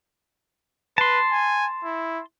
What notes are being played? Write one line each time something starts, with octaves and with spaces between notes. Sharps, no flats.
B4 A5 C6
G#5
E4